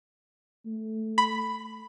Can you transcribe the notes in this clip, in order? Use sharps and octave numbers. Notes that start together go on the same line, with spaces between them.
A3
B5